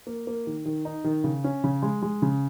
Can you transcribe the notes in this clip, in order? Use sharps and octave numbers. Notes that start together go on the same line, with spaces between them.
A#3
A#3
D#3
D#3
D#4
D#3
C#3
C#4
C#3
G#3
G#3
C#3